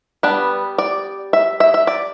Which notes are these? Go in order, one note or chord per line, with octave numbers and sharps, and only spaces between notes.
G3 B3 D4 B4
D5
E5
E5
E5
D5